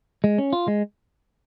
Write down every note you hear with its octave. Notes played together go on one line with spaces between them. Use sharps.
G#3
C#4
F4
G#3